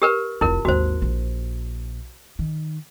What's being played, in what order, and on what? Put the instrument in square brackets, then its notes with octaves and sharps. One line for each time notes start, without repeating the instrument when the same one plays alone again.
[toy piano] G4 A#4 B4
[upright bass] F1 F4 [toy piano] E4 A#4
[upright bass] G#1 D#2 [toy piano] F#4 C5
[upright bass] A#1
D#3